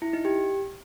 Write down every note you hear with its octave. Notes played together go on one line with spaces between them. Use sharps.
E4
D#4
G4